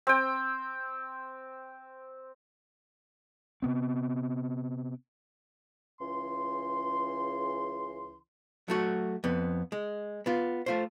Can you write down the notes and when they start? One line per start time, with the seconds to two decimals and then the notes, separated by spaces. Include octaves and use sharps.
0.07 C4 G5
3.62 C3 B3 C4
6.00 C#2 C#3 E3 C6
8.68 F#3 A3 F#4
9.24 F2 B3
9.72 G#3
10.26 B3 F4
10.66 A3 F4 C5